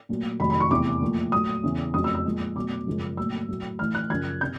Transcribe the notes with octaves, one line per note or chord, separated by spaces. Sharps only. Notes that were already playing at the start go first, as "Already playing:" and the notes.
A#2 F#3 A3
F2 C3 D#3 F#3 A3 B5
B5
C#6
E2 C3 E3 A3 D6
A#2 F3 A3
A#2 F#3 A3 D#6
E2 C#3 E3
F2 C#3 F#3 A3 D#6
E6
E6
A#2 F3 G#3
B2 F#3 A3 D6
F#2 C#3 F3 G#3
A#2 F#3 A3 E6
A2 F#3 A3
A2 E3 A3 F6
F#6
F#2 C#3 F3 G#6
C3 G6